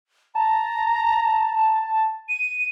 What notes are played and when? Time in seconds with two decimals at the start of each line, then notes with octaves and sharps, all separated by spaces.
0.35 A5 A#5
2.29 D#7